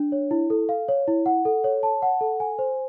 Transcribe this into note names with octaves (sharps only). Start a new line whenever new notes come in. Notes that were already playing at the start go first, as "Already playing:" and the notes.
Already playing: D4
C#5
E4
A4
F5
C#5
E4
F#5
A4
C#5
A5
F#5
A4
G#5
C5